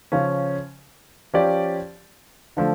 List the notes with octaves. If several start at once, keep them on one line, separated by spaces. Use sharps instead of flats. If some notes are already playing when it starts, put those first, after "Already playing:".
C#3 F3 C#4
F3 C#4 G4 D5
D3 F3 A3